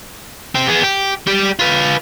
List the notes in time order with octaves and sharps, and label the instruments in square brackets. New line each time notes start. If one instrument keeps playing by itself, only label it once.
[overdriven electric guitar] C4 G4
B3 G#4
G4
G3 G4
F4 B4